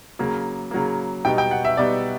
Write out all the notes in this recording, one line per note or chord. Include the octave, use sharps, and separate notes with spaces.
C#3 F#3 A#3
C#3 F#3 A#3
B2 G3 B3 D#4 G5
G5
F#5
E5
B2 G3 B3 D#4 D5